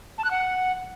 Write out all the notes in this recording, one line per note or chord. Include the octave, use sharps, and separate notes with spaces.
A5
F#6
F#5